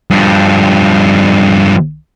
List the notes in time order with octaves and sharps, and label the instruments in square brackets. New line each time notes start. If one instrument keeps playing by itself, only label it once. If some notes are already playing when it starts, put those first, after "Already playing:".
[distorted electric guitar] G2 F3